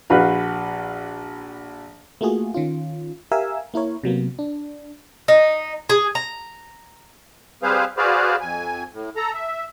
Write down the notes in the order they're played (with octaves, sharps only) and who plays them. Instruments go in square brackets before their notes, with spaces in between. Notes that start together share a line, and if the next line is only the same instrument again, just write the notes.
[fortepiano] A#1 F#4 B4 F5
[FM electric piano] A3 A#3 F4 F#4 G#4
D#3 C#4 F4
G4 A#4 E5 F5 G#5 E6
A#3 E4 A#4 C#5
C3 F#3 A#3 B3
D4
[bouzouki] D#4
G#4
A#5
[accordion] G3 C4 G#4 B4 C5 F5
F#4 G#4 B4 C5 D5 F5
F2 G#5
A2
A4 A#5
E5